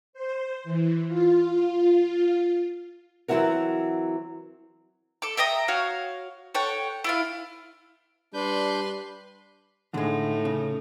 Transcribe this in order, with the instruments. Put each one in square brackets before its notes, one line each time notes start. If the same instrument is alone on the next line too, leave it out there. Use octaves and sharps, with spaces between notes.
[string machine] C5
E3
F4
[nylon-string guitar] E3 F#3 C4 E4 F#4 A#4
[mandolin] A4 D6
E5 G5 A#5 D#6
F#4 C#5 F5
A4 C#5 F#5 G5
E4 F4 F5
[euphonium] G3 [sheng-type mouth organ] D4 G6 [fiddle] B4 C6
[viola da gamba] A2 D#4 [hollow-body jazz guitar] D3 G#3
[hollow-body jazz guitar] C#3